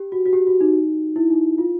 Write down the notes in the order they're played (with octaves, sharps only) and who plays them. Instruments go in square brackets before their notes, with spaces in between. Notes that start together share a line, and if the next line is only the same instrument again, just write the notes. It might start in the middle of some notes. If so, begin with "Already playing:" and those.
Already playing: [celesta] G4
F#4
F#4
G4
F#4
D#4
E4
D#4
F4